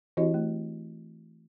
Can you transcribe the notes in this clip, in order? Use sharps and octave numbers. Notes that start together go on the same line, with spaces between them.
E3 C4 E4 F#4 G4 D#5
A3